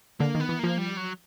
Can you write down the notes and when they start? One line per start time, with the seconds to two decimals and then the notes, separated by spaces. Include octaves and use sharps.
0.20 D3 A#3
0.35 D#3
0.40 B3
0.49 E3
0.59 F3 A#3
0.78 G3
0.97 F#3